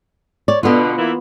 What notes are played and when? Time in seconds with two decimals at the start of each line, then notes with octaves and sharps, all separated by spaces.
0.48 C#5 D5
0.63 B2 D3 B3 F4
0.98 E3 A#3 E4